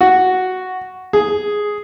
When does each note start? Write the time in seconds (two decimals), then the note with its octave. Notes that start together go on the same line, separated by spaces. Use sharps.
0.01 F#4
1.13 G#4